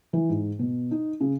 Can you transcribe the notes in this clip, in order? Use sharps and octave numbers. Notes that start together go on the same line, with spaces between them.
E3
G#2
B2
D#4
C#3